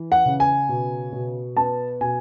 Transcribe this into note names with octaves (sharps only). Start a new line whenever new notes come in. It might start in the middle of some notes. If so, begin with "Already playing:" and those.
Already playing: E3
F#5
C#3
G#5
B2
B2
B3 A5
B2 G#5